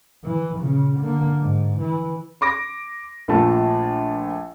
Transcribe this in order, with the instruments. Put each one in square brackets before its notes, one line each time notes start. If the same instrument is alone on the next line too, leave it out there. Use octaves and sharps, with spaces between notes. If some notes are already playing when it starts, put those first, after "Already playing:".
[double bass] E3
A#2 C#3
D3 A#3
G#2
E3
[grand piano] C6 D6 A#6 D7
A#1 A#2 A3 A5